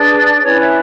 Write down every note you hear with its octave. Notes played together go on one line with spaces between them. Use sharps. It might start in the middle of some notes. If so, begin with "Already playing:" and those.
Already playing: D4 G#4 B4 D5
C#4 E4 B4 C#5
E5